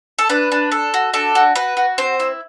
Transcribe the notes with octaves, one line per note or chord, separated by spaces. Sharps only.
A4
D4 B4
D4
A4
F#4
D4 A4
F#4
F#4 B4
F#4
C4 C5
E4